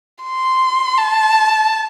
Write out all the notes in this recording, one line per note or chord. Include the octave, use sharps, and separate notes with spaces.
C6
A5